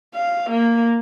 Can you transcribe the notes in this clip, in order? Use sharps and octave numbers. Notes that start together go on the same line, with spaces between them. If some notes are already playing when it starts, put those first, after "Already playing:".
F5
A#3